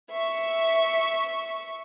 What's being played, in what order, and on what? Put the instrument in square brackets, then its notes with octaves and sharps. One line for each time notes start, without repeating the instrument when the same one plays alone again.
[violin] E5 C#6